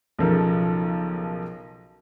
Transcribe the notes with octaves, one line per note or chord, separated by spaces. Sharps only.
B1 C#3 F3 A4 A#4